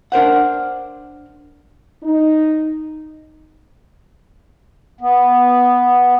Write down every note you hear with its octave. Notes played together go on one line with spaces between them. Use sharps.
D4 A#4 C5 F#5
D#4
B3